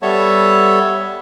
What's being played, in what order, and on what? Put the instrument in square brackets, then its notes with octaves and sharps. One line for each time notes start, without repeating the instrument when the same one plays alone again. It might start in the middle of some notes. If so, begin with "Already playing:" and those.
[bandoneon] G3 B3 A4 C#5 E5 A5